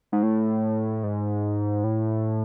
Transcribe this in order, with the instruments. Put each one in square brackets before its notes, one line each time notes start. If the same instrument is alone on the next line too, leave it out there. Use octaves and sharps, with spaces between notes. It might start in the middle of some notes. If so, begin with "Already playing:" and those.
[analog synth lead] G#2
A2
G#2
A2